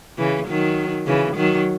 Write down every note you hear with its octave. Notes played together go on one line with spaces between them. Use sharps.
C#3 E3
D#3 F#3
C#3 E3
D#3 F#3